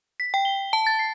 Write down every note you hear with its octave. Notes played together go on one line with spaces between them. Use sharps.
B6
G5
G7
A5
A6
C7